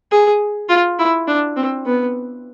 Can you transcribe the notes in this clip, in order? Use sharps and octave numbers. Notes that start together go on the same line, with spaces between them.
G#4
F4
E4
D4
C4
B3